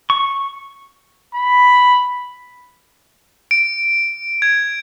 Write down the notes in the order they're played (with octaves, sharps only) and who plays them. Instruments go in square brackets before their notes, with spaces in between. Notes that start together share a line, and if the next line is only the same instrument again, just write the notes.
[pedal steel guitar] C#6
[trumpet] B5
[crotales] D7
G#6